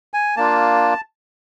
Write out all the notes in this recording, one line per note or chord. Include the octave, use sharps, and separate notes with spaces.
G#5
A#3 D4 F4 A5